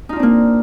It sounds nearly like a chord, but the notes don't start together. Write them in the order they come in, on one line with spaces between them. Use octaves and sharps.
D#4 F4 D4 C4 A#3